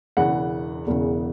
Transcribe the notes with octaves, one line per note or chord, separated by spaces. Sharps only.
E1 E2 C#3 E3 F#5
E1 E2 C#3 E3